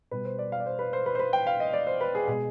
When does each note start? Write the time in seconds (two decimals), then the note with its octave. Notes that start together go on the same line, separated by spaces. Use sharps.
0.11 B2 G3 B4
0.25 C5
0.39 D5
0.52 F5
0.60 D5
0.66 C5
0.79 B4
0.93 C5
1.06 B4
1.15 C5
1.19 B4
1.33 G5
1.47 F5
1.60 D#5
1.73 D5
1.87 C5
2.01 B4
2.15 G#4
2.28 B2 G#3 G#4